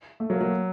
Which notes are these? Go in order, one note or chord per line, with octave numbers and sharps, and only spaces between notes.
A3
F#3 A#3
F#3